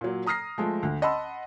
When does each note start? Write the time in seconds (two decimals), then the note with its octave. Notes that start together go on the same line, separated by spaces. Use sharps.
0.01 A#2 F#3
0.26 A#5 D#6 F6 A#6 C7
0.58 F3 G#3 A3
0.83 D2
1.02 D#5 F#5 A5 B5 C6 E6